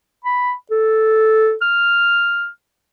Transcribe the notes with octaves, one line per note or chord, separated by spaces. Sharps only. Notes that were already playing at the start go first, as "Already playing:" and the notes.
B5
A4
F6